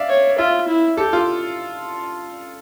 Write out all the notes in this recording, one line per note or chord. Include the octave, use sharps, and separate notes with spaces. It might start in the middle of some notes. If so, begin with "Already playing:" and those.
Already playing: D5 E5 F5
C#5
F4 E5
E4
G4 A4
F4